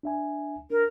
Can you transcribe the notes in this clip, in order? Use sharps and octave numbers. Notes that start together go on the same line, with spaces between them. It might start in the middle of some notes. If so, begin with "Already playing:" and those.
D4 E5 G#5
D4 A#4